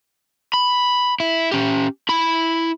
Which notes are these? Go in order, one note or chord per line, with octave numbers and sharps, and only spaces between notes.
B5
E4
C#4 G4
E4 B5